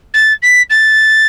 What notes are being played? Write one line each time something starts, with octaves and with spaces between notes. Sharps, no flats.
A6
B6
A6